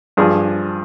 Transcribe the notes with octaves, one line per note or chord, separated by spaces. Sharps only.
G2 F3 G#4